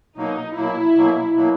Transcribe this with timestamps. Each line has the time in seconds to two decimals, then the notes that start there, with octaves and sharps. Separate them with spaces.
0.17 B2 F#3 A#3 D#4
0.56 B2 F#3 A#3 E4
0.96 B2 F#3 A#3
1.36 B2 F#3 A#3